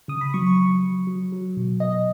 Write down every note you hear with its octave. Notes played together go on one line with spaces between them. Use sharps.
C#3 D#6
B5
F#3 C#6
C#6
F#3
F#3
F#3
F#3
B2
B2 D#5